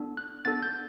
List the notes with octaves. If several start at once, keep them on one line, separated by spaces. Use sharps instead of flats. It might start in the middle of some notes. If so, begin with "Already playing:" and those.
Already playing: B3 D4 A4
F#6
B3 D4 A4 A6
G6